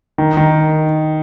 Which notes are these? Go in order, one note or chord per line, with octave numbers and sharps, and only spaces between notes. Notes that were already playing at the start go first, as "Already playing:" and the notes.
D#3
D#3